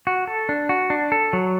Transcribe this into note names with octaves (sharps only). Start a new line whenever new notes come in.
F#4
A4
D4
F#4
D4
A4
F#3